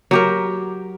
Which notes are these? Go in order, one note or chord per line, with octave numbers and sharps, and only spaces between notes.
F#3 G4 A#4